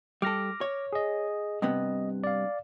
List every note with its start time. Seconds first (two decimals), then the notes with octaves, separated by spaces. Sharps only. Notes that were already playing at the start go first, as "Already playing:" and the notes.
0.22 G3 A4 D6 F6 A#6
0.61 C#5
0.93 G#4 D#5
1.62 G2 C3 B3 D#5
2.24 D5 F5